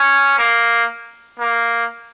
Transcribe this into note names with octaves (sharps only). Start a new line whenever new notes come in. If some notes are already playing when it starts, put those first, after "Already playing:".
Already playing: C#4
A#3
A#3